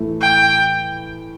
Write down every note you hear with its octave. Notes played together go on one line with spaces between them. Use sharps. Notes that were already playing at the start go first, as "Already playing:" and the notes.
Already playing: A2 E3 A3
G5